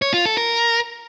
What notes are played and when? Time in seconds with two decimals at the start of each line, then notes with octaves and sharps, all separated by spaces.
0.02 C#5
0.14 F4
0.26 A4
0.37 A#4